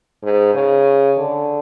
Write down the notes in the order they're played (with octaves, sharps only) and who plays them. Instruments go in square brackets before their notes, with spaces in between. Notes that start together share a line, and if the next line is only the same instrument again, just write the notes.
[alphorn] G#2
C#3
D3